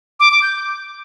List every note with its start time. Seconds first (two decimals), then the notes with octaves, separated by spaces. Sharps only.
0.20 D6
0.31 D6
0.42 G6